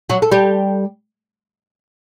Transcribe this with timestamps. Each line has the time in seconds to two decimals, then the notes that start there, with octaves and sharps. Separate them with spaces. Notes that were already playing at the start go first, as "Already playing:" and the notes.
0.09 F#3 F#4
0.22 A4
0.31 G3 G4